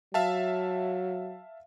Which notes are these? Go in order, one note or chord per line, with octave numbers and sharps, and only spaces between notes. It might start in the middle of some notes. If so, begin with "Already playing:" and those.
F#3 E5 F5 A5